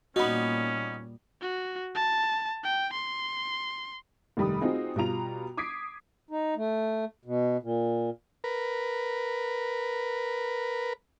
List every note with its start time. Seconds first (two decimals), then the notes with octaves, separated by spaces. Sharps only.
0.16 A#2 G3 A#3 B3 C#4 D#4 F#4 B5
1.41 F#4
1.95 A5
2.64 G5
2.93 C6
4.37 F1 D#3 G3 B5 D#6
4.61 C4 D#4 F4 F#4 G#4
4.96 B2 G3 F4 A#5 F7
5.57 D6 D#6 G#6 B6 C7 D7
6.31 D#4
6.57 A3
7.25 B2
7.63 A#2
8.44 A#4 B4